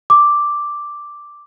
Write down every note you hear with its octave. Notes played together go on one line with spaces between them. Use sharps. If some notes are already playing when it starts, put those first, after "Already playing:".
D6